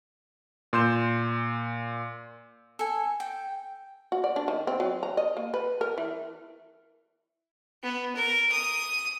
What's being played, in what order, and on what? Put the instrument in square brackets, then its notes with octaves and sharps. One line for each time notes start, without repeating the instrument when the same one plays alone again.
[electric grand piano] A#2 C6 G6 E7
[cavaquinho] A4 G#5
G5
[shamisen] F#4
D5
D4
D#3
C4
F#3
A#5
D#5
A#3
B4
A#4
E3
[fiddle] B3
A#4
D#6